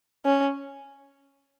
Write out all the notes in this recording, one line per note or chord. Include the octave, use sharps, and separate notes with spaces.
C#4